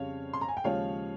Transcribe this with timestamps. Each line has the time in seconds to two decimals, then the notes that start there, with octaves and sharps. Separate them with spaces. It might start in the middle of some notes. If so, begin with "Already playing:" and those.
Already playing: F2 C#3 G3 C#5 F5
0.33 C6
0.41 A#5
0.49 G#5
0.57 G5
0.64 D#2 C#3 F3 G#3 C#5 F5